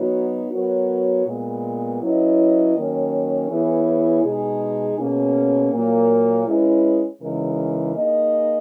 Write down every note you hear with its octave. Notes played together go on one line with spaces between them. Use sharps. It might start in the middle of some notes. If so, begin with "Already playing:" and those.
Already playing: F#3 B3 D#4 F#4 C#5
F#3 B3 F#4 A#4 C#5
A#2 G#3 B3
F#3 C#4 E4 B4 D#5
D#3 F#3 A#3 C#4
E3 B3 E4 G#4 C#5
B2 G#3 D#4 G#4
B2 A#3 C#4 G#4
A#2 F#3 A#3
G#3 C#4 E4 G#4 B4
C#3 E3 G#3 D#4 A#4
A#3 D#4 G#4 D#5